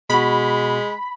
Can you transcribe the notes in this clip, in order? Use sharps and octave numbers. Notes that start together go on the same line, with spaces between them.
B2 G#3 F#4 B5